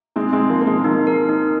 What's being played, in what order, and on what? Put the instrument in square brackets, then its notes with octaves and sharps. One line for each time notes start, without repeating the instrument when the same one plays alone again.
[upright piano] G#3 C4 [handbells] D#4
[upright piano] G#3 C4
[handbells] D#4
[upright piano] F3 A#3
[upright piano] A#3 [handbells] A#4
[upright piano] G#3
[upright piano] F3 A#3 [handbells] D#4
[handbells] A#4
D#4